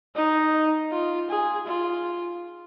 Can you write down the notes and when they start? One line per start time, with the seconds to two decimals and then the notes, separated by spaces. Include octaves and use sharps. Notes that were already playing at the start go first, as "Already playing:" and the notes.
0.15 D#4
0.92 F4
1.29 G#4
1.67 F4